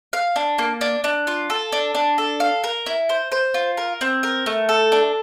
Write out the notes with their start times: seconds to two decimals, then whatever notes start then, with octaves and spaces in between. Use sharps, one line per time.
0.13 F5
0.36 D4
0.58 A#3
0.81 D4
1.04 D4
1.27 F4
1.50 A4
1.72 D4
1.95 D4
2.18 A4
2.40 F5
2.64 A#4
2.86 E4
3.09 C5
3.32 C5
3.54 F4
3.77 A#4
4.01 C4
4.23 A#4
4.46 A3
4.69 A4
4.92 D4